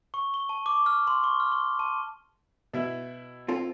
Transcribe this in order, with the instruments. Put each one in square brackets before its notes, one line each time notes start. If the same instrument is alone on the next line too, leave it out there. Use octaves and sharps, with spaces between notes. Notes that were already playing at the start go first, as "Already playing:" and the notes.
[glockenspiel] C#6
G7
A5
D6
F6
C6
C#6
F6
G7
A5
[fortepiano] B2 E4
[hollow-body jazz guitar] C4 F4 A4